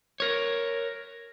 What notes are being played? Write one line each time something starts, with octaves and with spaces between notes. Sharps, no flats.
A#4 C#5